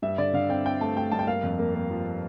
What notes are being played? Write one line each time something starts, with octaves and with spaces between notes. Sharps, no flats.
G2 E5
D3 D5
D3 F5
C4 G5
C4 G5
A3 A5
A3 G5
G2 A5
G5
A#3 F5
F2
A#3
A#3
F3